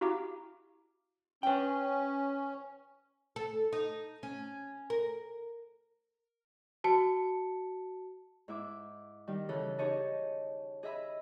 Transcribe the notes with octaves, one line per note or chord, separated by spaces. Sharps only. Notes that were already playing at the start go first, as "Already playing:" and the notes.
E4 F#4 G4 F5 A#5 D6
C#4 B4 G5
A4
D#4
C#4
A#4
F#4 A5 C#7
G#2 E4 E5 D6
D#3 G3
C#3 E3 G#4 A4
D#4 G4 G#4 C#5 D#5 A5
G#4 D#5 E5 B5